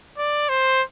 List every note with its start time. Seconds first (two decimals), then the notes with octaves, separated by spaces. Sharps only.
0.18 D5
0.49 C5